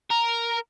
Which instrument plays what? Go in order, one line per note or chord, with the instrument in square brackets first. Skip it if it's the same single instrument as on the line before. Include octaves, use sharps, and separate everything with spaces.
[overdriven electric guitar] A#4